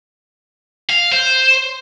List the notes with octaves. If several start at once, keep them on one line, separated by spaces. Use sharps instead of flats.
F5
C5